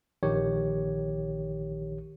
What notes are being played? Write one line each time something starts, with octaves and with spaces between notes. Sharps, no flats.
A#1 D#3 G4 C#5